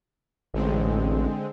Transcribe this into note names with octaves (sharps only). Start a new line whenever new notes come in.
A1 D3 G#3 C4